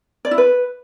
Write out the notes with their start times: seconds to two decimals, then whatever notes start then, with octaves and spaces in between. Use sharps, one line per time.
0.25 D5
0.31 E4
0.38 B4